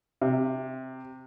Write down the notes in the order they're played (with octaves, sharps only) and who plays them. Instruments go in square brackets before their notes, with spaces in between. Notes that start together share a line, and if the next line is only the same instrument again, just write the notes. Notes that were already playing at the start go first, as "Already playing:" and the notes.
[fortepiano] C3